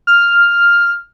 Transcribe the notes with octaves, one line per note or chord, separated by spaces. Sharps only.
F6